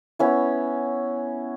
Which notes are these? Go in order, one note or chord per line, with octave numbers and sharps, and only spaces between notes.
B3 C#4 E4